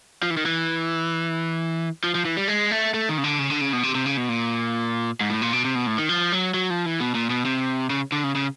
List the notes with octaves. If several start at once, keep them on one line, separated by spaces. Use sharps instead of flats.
F3
E3
D#3
E3
F3
F3
E3
G3
G#3
A3
A3
D#3
C#3
D3
C#3
D3
C#3
B2
C3
C3
C#3
B2
A#2
G#2
A2
A#2
B2
C3
B2
A2
D#3
F3
F#3
F#3
F3
E3
B2
A#2
B2
C3
C#3
D3
C#3
C#3